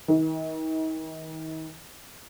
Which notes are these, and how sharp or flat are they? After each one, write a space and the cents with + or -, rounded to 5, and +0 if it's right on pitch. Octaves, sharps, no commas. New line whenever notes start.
D#3 +35